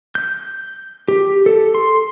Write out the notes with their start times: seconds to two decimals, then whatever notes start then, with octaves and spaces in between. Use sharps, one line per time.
0.15 G6
1.08 G4
1.46 A4
1.75 C6